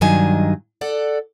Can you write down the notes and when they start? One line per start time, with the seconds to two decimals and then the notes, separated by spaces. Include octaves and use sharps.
0.01 G2 D#3 F#3 D#5 G#5
0.81 A4 D5 F#5